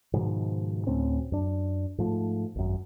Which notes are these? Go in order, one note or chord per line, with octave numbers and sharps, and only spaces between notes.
G#2 B2 D#3 F3
D2 A2 C4 C#4
F#2 D4
G#2 F3 A3
G#1 F#2